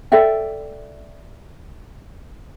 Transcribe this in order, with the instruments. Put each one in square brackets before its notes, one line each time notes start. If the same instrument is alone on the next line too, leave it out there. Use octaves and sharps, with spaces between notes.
[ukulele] A4 D5 E5 G5